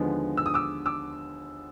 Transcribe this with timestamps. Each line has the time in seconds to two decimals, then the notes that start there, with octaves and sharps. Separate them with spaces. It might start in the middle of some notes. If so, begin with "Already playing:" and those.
Already playing: D#2 D3 F3 G#3 B3
0.37 E6
0.46 D#6
0.54 D6 E6
0.86 D6 E6